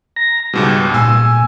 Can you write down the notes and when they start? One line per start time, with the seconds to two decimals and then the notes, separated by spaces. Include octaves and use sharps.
0.16 A#5 A#6
0.53 C#2 G#2 B2 G3
0.94 A#2 G#5 E6